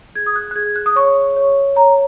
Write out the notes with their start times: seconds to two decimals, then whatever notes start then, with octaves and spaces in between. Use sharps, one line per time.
0.15 G#4 G#6
0.26 D#6
0.36 F#6
0.51 F#6
0.56 G#4 G#6
0.76 F#6
0.86 D#6
0.96 C#5 C#6
1.36 C#5
1.76 C#5 A#5